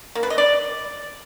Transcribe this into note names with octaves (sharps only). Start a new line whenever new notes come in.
A#3
B4
D#5
D5